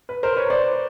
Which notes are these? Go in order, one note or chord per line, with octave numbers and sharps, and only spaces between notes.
B4
A#4 C5
B4 C#5
C5 D5